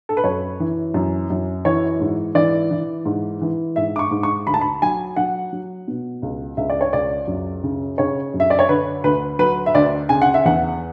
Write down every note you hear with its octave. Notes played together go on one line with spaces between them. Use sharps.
A4
B4
F#2 C#5
E3
F#2
F#2
E3 C#5
G#2
E3 D5
E3
G#2
E3
G#2 E5
D6
C#6
G#2
C#6
D2 B5
A5
B5
F#3 G#5
F#3 F#5
F#3
B2
C#2
C#2 E5
D5
C#5
C#2 D5
F#2
C#3
C#3 C#5
F#2
E5
D5
C#5
D3 B4
D2 B4
F#3 B4
E5
D2 D5
C#3 G#5
F#5
E5
E2 F#5